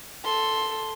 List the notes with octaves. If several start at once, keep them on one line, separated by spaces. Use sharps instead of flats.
A4 C6